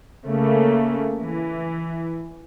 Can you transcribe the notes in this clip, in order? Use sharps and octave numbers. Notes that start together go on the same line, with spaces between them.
C#3 A3 A#3
E3